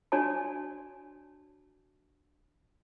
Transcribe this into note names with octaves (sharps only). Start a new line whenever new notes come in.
D4 F#4 C#5 D5 G#5 A5